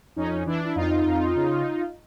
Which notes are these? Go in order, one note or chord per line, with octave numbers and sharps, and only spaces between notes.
F2 C#4 D#4
E3 D4 E4
E4
F2 D#4 F4
F2
C#3